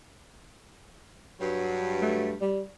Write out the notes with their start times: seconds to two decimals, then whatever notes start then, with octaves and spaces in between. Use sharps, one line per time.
1.40 G2 F#3
2.02 A3
2.41 G3